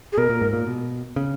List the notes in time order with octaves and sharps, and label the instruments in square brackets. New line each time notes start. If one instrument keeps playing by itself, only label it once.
[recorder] G#4
[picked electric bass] B2 [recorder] A#4
[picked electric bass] A#2
G#2
A#2
B2
C#3